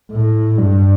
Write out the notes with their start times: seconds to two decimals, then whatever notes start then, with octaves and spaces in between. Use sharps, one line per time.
0.11 A2
0.58 G2